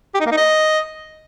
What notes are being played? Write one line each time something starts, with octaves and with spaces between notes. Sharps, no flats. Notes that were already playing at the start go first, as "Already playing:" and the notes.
G4
D#4
A#3
D#4
D#5